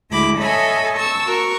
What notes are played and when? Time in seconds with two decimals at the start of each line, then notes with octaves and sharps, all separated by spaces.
0.11 D2 D3 G#3 E4 B5 D6
0.39 A4 C#5 D#5 E5 G#5 B5
0.96 A5 C#6 E6
1.25 F#4 A#4 C#6